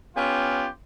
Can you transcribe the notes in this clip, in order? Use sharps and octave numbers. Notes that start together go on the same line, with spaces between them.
B3 C#4 F4 G4